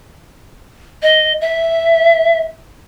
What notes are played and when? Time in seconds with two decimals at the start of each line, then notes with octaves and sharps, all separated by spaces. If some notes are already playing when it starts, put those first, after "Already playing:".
1.03 D#5
1.41 E5